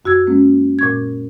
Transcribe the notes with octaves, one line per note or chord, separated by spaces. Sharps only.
F#2 F#4 E6 G#6
G#3 A#3 C#4
A#2 C#6 G#6